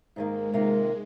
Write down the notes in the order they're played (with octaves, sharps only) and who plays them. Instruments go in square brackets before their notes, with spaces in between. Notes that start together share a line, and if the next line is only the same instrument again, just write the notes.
[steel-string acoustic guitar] G#2 D#3 A#3 [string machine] G#3
[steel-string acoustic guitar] C3 D#3 A#3 F4